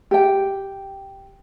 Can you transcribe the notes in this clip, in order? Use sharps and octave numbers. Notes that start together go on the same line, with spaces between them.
G4 G5